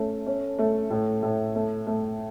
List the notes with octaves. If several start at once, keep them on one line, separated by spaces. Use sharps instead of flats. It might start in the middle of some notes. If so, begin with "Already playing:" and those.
Already playing: A3 C#4
C#4
A3
A2
A2
A3
A3